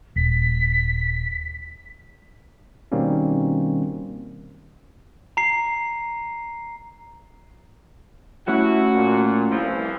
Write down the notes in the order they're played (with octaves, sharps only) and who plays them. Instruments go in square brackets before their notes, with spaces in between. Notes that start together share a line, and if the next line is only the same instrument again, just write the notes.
[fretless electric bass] D#1 [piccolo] B6
[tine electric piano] B2 D#3 G3 A#3 C4 C#4
[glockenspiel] A#5 C7
[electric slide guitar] A3 C#4 G4 [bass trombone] E4 [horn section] F#4
[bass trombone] A#2
[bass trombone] C2 [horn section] E3 F3